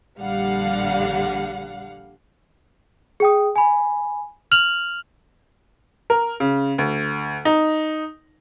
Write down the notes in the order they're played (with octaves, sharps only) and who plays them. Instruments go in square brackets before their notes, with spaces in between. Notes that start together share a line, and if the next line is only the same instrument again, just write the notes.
[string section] A#1 D3 G3 F5 F#5
[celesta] G#4 G5 D#6
G#5 B5
F6 F7 F#7
[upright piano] A#4
C#3
D2
D#4